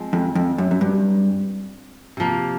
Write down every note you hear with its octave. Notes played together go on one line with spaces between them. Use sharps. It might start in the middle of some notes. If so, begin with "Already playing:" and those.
Already playing: F3 G#3 C4
F2
F2
F#2
F#2
G2
C3 F3 A#3